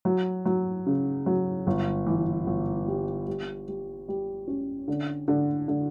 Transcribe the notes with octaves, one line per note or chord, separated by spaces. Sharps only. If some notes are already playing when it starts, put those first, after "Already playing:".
F#3
F#3
C#3
F#3
G1
E3
G1
G3
G3
G3
G3
C#4
D3
D3
D3